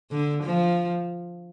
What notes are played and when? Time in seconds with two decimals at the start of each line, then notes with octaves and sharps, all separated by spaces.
0.11 D3
0.43 F3